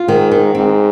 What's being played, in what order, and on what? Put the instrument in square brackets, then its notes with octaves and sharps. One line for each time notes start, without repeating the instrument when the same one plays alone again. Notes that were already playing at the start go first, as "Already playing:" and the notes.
Already playing: [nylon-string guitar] F4
[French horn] G#2 [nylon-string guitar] D#3
[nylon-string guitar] D#3
[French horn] G#2 [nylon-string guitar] C4